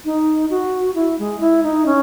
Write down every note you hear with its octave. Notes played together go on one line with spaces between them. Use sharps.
D#4
F#4
E4
G#3
E4
D#4
C#4